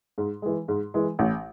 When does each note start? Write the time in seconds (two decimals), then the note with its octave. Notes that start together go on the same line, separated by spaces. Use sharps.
0.18 G#2
0.42 E3 G#3
0.68 G#2
0.94 E3 G#3
1.19 A1